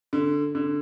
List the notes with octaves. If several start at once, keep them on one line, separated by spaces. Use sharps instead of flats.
D3
D3